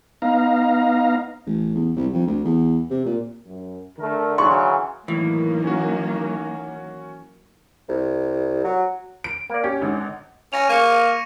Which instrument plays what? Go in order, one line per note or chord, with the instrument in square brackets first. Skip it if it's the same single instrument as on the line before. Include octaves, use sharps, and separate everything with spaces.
[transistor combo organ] B3 D#4 F5 A#5
[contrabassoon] A1
E2
C2
F2
D2
E2
C3
A#2
[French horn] F#2
[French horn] D3 [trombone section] A3 A#4
[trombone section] C#3 E3 F#3 [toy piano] C6 [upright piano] C#6
[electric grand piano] A2 [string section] D#3 F#3 A#3 [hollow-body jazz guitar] E3
[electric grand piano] C#4 F#4
[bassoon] C2
F#3
[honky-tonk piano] D7
[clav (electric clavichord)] A#3 D5
[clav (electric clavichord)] C#4 [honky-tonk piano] G4
[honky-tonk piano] G#1 D3
[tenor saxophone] C#4 [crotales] A#6 D#7 F7
[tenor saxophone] A#3 [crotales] C#6 C#7